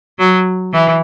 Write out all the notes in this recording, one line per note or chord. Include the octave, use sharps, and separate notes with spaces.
F#3
E3